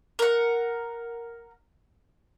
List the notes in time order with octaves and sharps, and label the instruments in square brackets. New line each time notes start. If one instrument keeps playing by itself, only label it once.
[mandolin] A#4 F#5